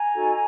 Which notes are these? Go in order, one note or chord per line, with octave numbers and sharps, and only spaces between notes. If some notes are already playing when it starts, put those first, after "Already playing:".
Already playing: G#5 A#5
D#4 F#4 A4